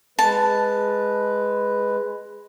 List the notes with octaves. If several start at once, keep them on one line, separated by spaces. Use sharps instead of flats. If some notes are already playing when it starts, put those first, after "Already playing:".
G#3 B4 A5